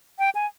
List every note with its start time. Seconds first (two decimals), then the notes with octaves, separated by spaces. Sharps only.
0.19 G5
0.35 G#5